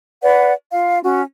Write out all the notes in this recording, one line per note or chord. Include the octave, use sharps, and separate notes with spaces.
B4 D5 F#5
F4 F5
C#4 F#4